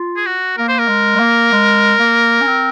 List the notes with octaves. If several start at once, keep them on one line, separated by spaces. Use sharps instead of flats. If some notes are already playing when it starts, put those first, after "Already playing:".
Already playing: F4
G#4
F#4
A#3 A#4
C5
A#4
G#3
G#3
A#3
G#3
A#3
C#4
C4